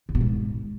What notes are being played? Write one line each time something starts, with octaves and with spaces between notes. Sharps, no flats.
D3
B2
G#2